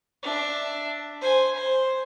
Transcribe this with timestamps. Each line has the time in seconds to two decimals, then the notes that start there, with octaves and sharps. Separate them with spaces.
0.23 D4 E5
1.21 C5 G#5
1.55 C5